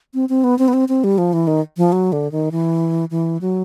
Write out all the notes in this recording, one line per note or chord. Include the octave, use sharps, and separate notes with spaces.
C4
C4
B3
C4
B3
C4
C4
G3
F3
E3
D#3
F3
F#3
D3
D#3
E3
E3
F#3